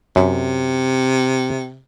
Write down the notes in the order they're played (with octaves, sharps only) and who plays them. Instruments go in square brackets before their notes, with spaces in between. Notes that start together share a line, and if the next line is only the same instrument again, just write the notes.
[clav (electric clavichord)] F#2 [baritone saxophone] C3